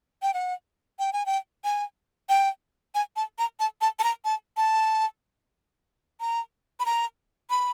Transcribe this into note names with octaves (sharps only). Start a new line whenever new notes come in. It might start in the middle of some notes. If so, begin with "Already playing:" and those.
G5
F#5
G5
G#5
G5
G#5
G5
G#5
A5
A#5
A5
A5
A5
A#5
A5
A5
A#5
B5
A#5
B5